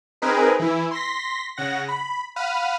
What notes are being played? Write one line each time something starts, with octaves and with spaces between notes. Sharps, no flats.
C4 D#4 G#4 A#4 B4
E3 E4
C6 A#6 B6
C#3 F#5 A#6
B5
F5 F#5 B5 D#7